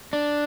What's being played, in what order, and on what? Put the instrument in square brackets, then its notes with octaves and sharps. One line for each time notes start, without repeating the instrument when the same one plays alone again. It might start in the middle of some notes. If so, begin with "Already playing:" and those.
[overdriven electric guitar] D4